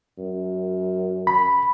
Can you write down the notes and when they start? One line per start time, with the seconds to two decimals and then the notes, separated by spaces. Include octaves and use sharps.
0.18 F#2
1.27 B5